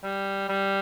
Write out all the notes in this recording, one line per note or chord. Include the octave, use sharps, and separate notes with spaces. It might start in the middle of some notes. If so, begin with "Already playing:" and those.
G3
G3